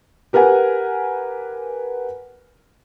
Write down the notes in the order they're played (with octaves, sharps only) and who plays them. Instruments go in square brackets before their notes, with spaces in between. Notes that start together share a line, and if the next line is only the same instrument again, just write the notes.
[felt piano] G4 A#4 B4 F#5 G#5